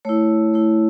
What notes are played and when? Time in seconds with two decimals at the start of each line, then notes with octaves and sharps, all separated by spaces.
0.05 A3 E4 C#5
0.53 A3 E4